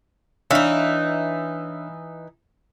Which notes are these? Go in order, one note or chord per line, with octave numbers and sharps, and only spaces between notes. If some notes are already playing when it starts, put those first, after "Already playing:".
E3 D4 D#4 C#5 E5 F5